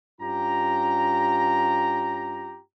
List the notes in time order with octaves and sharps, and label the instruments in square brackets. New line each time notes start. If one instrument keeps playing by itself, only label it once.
[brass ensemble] G2 C#4 F4 G4 A#5